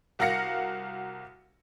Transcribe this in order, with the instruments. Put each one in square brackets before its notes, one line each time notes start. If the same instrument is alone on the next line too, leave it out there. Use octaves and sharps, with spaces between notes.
[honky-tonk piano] C2 F#4 A#4 F5 A#6 C#7